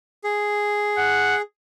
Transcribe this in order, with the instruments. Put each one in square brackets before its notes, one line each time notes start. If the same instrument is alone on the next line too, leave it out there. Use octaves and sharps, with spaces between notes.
[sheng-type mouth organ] G#4
[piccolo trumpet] F#5